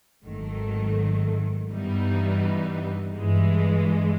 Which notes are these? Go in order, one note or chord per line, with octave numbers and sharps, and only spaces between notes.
G#1 G#2 D#3 F#3 A3
G2 E3 G3 B3 D#4
G1 G2 E3 G#3